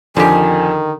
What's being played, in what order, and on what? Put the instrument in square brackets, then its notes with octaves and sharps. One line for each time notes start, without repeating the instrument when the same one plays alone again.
[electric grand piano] F2 F3 [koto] D3 G4 [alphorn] D#3 [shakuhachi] G#5